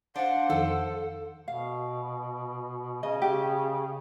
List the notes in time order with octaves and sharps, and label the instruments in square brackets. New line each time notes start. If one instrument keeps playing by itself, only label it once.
[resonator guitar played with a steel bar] D4 [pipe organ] C5 F5 C6 [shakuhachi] F#5
[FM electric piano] F2 D#3 [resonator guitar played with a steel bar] A4
[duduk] B2 [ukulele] F5
[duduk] C#3 [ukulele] D#5
[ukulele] G4